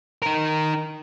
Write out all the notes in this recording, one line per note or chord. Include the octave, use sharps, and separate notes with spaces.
D#4 A#4